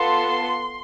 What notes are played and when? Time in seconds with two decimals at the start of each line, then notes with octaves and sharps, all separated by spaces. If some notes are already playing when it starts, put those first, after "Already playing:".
Already playing: B3 F4 A4 C6